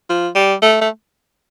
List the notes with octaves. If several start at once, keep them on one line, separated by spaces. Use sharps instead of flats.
F3
G3
A3
A3